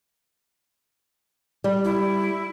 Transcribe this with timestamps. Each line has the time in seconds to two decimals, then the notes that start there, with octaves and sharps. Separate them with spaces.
1.64 G3
1.84 E4